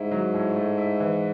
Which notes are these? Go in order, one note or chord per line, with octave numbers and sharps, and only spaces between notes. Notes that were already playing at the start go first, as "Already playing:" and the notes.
Already playing: G#2 E4
F#3
A2
A3
E4
E3